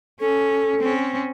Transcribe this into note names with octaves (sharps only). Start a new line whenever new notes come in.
C#4 A4
C4 C#4